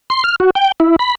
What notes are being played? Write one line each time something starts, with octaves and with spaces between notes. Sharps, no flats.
C6
F6
F#4
G5
E4
B5